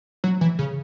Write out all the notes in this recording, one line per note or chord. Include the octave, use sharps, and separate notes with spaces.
F#3
E3
C#3